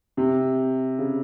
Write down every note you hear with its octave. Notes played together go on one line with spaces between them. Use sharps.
C3
C#3